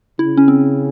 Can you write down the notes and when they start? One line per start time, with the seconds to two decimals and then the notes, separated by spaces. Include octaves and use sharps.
0.19 C#3 E4
0.37 C#4
0.48 C4